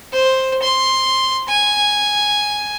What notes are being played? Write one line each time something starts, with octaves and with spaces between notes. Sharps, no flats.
C5
C6
G#5